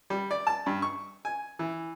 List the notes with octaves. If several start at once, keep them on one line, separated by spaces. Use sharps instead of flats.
G3
D5
A5
G2
C#6
G#5
E3